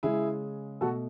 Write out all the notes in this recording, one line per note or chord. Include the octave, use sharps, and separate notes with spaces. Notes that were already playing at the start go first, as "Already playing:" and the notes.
C#3 G#3 E4 G#4
B2 A3 F#4 A4